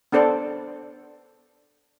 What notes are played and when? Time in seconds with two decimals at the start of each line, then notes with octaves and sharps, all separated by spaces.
0.12 B3 D4 A4 C5 D5